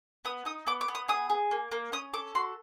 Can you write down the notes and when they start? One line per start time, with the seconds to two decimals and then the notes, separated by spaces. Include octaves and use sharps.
0.25 B3 D#6
0.45 D#4 D#6
0.67 B3 D6
0.81 D6
0.88 B3
0.95 D#6
1.08 G#4 D#6
1.30 G#4
1.51 A#3
1.71 A#3
1.92 C#4 D#6
2.13 A4 D6
2.35 F#4 C6